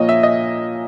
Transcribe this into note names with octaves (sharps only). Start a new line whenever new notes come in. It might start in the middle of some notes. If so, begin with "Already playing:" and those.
Already playing: A#2 F3 A#3 C#5 D#5
E5
D#5